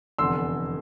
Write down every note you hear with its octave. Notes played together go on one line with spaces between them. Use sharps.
F1 E2 D3 C6 E6